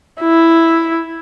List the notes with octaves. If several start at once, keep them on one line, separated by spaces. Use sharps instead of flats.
E4